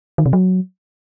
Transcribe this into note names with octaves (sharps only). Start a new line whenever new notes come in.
D#3
C3
F#3